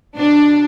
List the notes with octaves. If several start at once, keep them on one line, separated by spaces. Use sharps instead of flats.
B2 D4